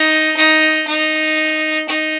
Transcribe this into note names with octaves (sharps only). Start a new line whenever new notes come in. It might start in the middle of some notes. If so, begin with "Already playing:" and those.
Already playing: D#4
D#4
D#4
D#4